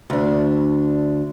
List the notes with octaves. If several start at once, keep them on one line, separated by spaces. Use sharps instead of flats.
D2 D4